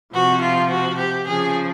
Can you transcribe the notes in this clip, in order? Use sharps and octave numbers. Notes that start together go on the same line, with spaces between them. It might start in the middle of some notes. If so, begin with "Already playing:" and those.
C3 F3 F#4
F4
F#4
G4
C#3 F3 G#4